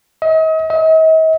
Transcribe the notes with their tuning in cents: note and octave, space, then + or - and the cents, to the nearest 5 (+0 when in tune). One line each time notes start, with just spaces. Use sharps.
D#5 +40
D#5 +45